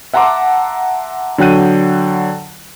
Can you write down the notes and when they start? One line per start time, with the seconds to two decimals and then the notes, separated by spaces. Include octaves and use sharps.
0.13 E5 F#5 A5 A#5 C6 D6
1.38 D3 F#3 G5 F#6 D#7